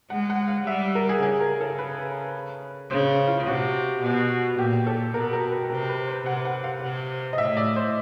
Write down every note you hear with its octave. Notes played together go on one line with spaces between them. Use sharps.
G#3 F#5
F#5
F5
G3 E5
A#4
G#4
C#3 G#4
A#4
A4
B4
C#3 C5
F4
C3 F#4
B2
A#2 G4
A4
B2 A#4
A#4
B4
C3 A#4
B4
C5
C3 F#5
F#5
F5
C3
D#5
A2 E5
D5
C5